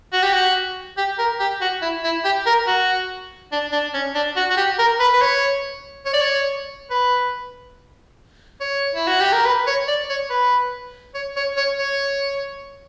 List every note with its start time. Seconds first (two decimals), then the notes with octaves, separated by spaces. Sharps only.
0.13 F#4
0.22 G4
0.33 F#4
0.97 G4
1.18 A#4
1.40 G4
1.61 F#4
1.82 E4
2.04 E4
2.25 G4
2.46 A#4
2.67 F#4
3.52 D4
3.72 D4
3.94 C#4
4.15 D4
4.36 F#4
4.50 F#4
4.57 G4
4.79 A#4
5.00 B4
5.13 B4
5.21 C#5
6.06 C#5
6.14 D5
6.21 C#5
6.90 B4
8.60 C#5
8.95 E4
9.07 F#4
9.20 G4
9.33 A#4
9.46 B4
9.67 C#5
9.88 D5
10.09 C#5
10.30 B4
11.15 C#5
11.36 C#5
11.57 C#5
11.79 C#5